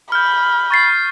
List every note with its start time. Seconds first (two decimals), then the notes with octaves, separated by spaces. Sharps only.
0.12 B5 F6 G6
0.70 C#6 A6 C7